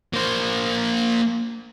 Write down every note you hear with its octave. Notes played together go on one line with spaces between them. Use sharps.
A#3 C5